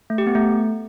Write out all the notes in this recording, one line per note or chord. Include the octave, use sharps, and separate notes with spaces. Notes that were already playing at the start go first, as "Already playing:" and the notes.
A3
G4
B3
A3